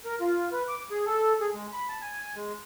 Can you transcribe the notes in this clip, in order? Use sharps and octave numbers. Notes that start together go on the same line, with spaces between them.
A#4
F4
B4
D6
G#4
A4
G#4
G#3
B5
A5
G#5
G#3